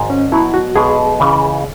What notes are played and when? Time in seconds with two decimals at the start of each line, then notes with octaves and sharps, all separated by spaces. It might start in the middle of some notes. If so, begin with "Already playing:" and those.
Already playing: G#1 G#2 G#3
0.10 C#4
0.32 B2 F#3 B3 E4
0.54 F#4
0.75 B1 B2 G#3 G#4
1.20 C#2 C#3 E3